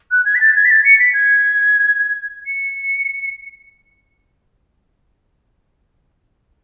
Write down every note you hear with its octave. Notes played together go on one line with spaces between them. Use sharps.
F#6
G#6
B6
A6
G#6
B6
A6
C#7
B6
G#6
C#7